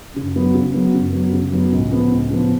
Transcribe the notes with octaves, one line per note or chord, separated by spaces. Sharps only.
F#2 C#3
F#3 B3
C#3
F#3 B3
F#2 C#3
F#3 B3
C#3
F#3 B3
C#2 A2
C#3 F3 B3
C#2
C#3 F3 B3